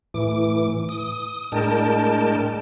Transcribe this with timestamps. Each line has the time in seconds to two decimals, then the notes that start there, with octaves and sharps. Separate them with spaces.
0.14 A2 E3 D6
0.89 D#6
1.52 A2 G#3 D4 A#4 G5 A5